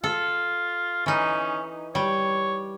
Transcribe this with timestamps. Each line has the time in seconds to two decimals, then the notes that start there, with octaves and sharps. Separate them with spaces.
0.04 F4 A4
1.06 E3 C#4 D#4
1.95 G3 C#5